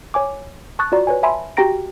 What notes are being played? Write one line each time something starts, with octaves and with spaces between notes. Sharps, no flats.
C#5 G#5 D6
A5 C#6 D#6 F#6 A6
F4 F#4 D5 A#5
B4 C#5 G#5
E5 G#5 A5 B5 C6
F#4 G4 G5 A#5 A#6 D7